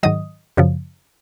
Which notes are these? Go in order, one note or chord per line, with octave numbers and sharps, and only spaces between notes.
G#2 D#3 F#3 D#5 D#6
F#2 C#3 F3